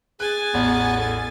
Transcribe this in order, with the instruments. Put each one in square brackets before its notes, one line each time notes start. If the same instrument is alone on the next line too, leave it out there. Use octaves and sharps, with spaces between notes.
[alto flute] G#4 [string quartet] G#5 A6 [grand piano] F#6
[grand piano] A1 E2 C#5 [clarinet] B3
[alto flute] A4